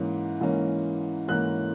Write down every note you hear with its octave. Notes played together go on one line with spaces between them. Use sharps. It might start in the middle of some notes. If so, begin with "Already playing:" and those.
Already playing: G#2 E3 A#3 C#4
G#2 E3 A#3 C#4
G#2 E3 A#3 C#4 F#6